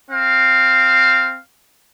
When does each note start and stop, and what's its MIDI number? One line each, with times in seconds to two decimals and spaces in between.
0.10 1.40 60
0.10 1.40 77